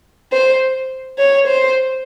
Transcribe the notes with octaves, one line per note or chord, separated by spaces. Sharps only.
C5
C#5
C5